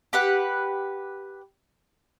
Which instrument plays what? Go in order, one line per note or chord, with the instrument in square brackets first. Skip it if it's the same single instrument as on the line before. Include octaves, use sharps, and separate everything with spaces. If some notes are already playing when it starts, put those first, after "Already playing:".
[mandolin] G4 B4 F#5